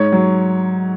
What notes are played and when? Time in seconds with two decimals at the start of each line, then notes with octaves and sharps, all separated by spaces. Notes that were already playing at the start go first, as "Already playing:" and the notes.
Already playing: G#2 C#5
0.12 F#3